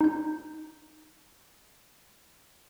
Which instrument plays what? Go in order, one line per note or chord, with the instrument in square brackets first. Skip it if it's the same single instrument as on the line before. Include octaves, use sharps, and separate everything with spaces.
[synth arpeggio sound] D#4 G6